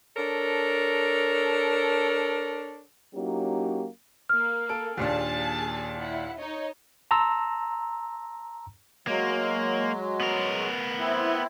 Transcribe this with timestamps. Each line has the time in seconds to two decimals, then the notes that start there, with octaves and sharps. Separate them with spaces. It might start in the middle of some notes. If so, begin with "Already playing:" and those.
0.16 D4 A4 A#4 C#5
3.14 F#3 A#3 C#4 D#4 E4 G4
4.29 A#3 F6
4.69 A4 D7
4.97 D#2 A#2 D4 G#4 A5
5.98 E4 F#5
6.38 D#4 C#5 D#5
7.11 A5 A#5 C6 E6
9.07 F#3 G#3 A#3
10.20 B3 A#4
10.99 C4 E4